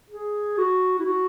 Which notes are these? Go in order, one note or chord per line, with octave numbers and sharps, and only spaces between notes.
G#4
F#4
E4
F#4